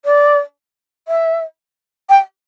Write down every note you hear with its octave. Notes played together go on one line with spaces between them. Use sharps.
D5
E5
G5